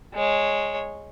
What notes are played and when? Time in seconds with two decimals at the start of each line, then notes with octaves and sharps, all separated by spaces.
0.14 G#3 C#5